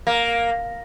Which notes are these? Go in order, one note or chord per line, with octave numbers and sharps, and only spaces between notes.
A#3